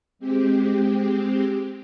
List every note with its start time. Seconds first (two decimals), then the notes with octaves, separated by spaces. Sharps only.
0.19 G#3 C4 G4